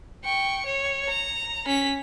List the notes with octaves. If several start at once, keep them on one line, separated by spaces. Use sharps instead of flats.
G5 C#6
C#5
A#5
C#4 B6